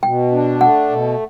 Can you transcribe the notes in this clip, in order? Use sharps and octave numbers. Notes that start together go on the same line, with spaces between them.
B2 G5
D4
A3 F#5
B2